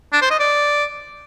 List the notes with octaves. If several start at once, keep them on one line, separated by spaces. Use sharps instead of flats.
D4
C5
D#5
D5